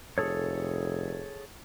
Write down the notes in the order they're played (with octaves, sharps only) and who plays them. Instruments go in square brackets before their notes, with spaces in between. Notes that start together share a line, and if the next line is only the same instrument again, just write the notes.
[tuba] F1 [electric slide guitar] G#4 A4 C#5